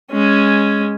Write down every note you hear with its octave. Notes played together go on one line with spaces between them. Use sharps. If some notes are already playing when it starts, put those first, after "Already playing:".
G#3 C#4